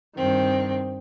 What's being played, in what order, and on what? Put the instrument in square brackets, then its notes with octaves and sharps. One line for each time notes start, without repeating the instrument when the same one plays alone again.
[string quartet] G2 D#3 C4